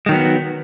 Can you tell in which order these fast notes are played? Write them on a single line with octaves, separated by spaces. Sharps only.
G#3 D#3 F#3 B3